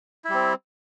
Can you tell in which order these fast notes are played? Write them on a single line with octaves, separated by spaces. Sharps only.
E4 G3 C4